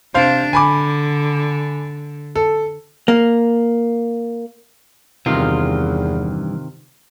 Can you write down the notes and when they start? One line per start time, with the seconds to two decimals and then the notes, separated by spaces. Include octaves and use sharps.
0.14 C3 D4 C5 F5
0.53 D3 G#5 B5 D6
2.36 A4
3.08 A#3
5.26 E2 G2 C3 D#3 E3 F4